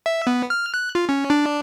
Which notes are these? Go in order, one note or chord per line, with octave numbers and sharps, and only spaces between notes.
E5
B3
F6
F#6
F4
C#4
D4